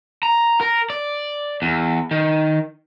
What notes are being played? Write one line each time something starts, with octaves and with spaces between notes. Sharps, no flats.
A#5
A#4
D5
E2
D#3